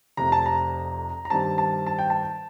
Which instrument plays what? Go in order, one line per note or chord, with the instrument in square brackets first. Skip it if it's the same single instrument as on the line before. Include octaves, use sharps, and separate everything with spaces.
[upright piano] F1 F2 C3 A#5
A5
A#5
A#5
G2 D#3 G3 C4 A5
A5
A5
G5
A5